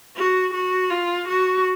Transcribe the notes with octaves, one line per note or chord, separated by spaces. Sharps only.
F#4
F#4
F4
F#4